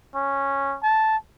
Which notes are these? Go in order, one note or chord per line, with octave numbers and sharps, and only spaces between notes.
C#4
A5